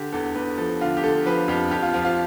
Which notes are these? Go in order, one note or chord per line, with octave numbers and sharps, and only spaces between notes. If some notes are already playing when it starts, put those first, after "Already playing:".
Already playing: D3 G4
E2 A4
E2 B4
F3 A4
D3 F4
G4
D3 A4
F3 B4
F2 G4
F2 G4
F4
F3 F4
F4